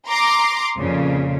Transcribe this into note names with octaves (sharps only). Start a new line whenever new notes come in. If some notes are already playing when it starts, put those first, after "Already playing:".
A#5 C6 D6
F2 A#2 C#3